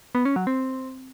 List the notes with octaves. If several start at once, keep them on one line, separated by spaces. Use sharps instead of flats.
B3
C#4
F#3
C4